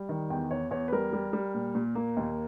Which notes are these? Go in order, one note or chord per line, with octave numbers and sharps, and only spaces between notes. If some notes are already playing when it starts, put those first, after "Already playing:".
Already playing: G3
D#3
E2 G5
E2 C#5
E2 C#5
B4
G3 A#4
G3
G3
A#2
A#2
A#3
D#2